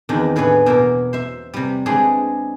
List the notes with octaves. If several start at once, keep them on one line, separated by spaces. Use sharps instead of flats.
E2 D#3 C4 D4 B4
A2 E3 G#4 B4 C#5
B2 A#3 E4 A#4
C5 E5
C3 G3
G#3 C4 D4 G#4 B4